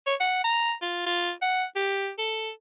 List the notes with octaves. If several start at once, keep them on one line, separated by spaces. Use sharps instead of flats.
C#5
F#5
A#5
F4
F4
F#5
G4
A4